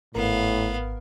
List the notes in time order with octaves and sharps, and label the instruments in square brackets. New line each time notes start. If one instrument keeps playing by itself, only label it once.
[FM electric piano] G#1 A#4 [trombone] A2 [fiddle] B3 F5